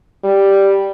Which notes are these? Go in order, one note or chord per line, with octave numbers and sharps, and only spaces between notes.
G3